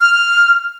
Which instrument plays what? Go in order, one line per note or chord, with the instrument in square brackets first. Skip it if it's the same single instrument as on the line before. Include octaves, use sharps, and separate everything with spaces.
[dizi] F6